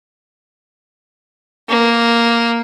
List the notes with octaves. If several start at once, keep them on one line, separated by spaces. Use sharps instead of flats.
A#3